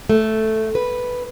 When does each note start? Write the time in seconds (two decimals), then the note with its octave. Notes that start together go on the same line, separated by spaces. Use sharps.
0.09 A3
0.75 B4